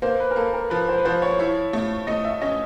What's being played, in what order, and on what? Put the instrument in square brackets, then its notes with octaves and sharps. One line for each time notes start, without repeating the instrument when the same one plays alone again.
[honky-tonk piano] A#3 [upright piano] C5
[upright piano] B4
A#4
[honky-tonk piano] A#3 [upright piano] A4
[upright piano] A#4
[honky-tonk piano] F3 [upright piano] B4
[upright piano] C5
B4
[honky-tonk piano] F3 [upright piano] C5
[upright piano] C#5
[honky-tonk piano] E4 [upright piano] C#5
[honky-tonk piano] A3
[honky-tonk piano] A3 [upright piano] D#5
[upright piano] E5
[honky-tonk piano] C#4 [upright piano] D#5